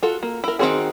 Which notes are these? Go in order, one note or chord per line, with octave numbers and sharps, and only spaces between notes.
F4 F#4 A4
A#3
E4 A#4
D#3 B3 C4 F#4 G#4